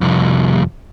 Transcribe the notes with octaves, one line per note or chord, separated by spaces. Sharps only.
C2 F2